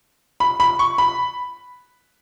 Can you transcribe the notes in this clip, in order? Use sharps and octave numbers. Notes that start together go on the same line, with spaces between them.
B5
B5
C#6
B5